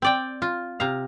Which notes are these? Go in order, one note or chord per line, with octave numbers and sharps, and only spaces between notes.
C4 D5 G5
F4
C3 F5 A#5